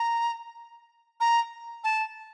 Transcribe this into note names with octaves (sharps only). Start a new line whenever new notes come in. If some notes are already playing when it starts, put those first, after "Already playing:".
Already playing: A#5
A#5
A5